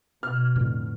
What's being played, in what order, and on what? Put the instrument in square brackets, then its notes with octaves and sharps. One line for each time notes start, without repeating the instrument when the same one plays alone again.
[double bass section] B2 [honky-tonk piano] F6
[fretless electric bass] F2 A2 D3